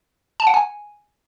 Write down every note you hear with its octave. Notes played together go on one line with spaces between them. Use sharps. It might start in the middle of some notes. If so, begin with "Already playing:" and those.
A5
F#5
G#5